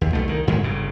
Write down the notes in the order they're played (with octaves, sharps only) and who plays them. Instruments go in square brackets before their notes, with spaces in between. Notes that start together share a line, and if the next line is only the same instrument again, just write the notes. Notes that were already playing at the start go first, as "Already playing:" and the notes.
[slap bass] D#2
B1 A3
C2 D#3
F2 G#2 D#3 G#3
G1 G2 C#3